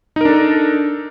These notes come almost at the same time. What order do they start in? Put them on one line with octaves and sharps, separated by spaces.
D#4 A#4 D4 A4